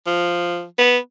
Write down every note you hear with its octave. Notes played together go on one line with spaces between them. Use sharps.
F3
B3